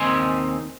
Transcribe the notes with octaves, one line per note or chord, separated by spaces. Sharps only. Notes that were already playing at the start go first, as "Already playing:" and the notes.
Already playing: D#2 D#3 C4 D#4 G#5 C6